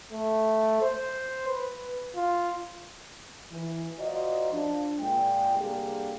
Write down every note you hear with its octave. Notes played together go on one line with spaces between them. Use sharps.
A3
C5
B4
F4
E3
F4 F#4 A#4 C5 D5 D#5
F3 D4
A#2 G#3 G5
C2 D3 G3 A#3 G4 G#4